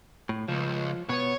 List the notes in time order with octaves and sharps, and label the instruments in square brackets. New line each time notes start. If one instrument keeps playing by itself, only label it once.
[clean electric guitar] A2
[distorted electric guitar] C#2 [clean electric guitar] F3
[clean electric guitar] B2 B3 [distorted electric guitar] C#5